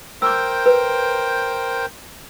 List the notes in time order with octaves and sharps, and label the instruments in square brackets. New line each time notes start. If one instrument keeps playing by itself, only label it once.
[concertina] A#4 C5 G5 [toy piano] D6 E6
[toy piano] B4